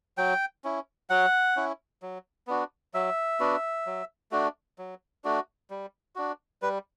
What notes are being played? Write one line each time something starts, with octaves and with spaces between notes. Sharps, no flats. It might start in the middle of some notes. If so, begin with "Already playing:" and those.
F#3 G5
C#4 E4
F#3 F#5
C#4 E4
F#3
B3 D4 F#4
F#3 E5
B3 D4 F#4
F#3
A3 D4 F#4
F#3
A3 D4 F#4
G3
D4 F#4
G3 B4